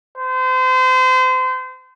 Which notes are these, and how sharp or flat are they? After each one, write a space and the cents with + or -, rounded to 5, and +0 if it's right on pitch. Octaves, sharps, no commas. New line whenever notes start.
C5 -35